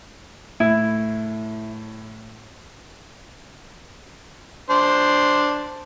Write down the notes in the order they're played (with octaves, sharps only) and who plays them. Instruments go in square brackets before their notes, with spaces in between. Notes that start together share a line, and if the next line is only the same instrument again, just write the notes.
[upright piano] A2 [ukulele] E4
[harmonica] D4 C5